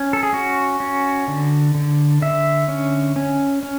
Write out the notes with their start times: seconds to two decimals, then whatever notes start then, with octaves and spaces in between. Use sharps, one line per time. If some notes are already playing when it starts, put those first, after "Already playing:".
Already playing: C#4
0.13 A4
0.23 G#4
0.33 C#4 F#4
0.80 C#4
1.28 D3
1.75 D3
2.22 D3 E5
2.68 C#4
3.16 C#4
3.63 C#4